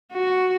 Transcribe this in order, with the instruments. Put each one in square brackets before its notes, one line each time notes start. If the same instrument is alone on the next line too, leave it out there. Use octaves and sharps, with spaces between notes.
[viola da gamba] F#4